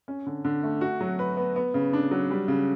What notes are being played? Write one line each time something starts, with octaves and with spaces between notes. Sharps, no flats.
C#4
D3
D3
A3
F#4
F#3
B4
B3
B3
C#3
D4
F#3
G3
C#3